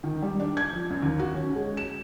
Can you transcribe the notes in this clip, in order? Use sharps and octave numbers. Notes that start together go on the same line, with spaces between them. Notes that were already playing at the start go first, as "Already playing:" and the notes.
D#3
G3
D4
G#6
F3
F#2
D#2
F#4
C#4
G#3
E7